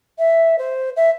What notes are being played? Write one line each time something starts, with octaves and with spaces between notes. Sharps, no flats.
E5
C5
E5